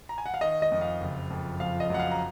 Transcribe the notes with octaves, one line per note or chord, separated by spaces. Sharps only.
A#5
G#5
F#5
F5
D#3 D#5
D#5
F2
F5
F#1
F2
F3 F5
D#5
F#2 F#5
F5
A#5